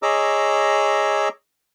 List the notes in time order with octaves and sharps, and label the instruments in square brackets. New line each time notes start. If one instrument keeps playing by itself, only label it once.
[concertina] G#4 C#5 D#5 A#5 D6 E6